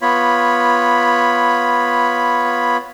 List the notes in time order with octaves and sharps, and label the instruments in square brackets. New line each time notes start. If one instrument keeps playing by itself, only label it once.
[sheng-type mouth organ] B3 F4 C#5 B5